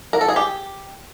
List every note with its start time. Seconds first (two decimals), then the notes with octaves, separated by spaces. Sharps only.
0.13 A#4
0.21 A4
0.28 G#4
0.36 G4